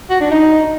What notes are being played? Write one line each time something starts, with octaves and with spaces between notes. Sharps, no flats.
F#4
D4
D#4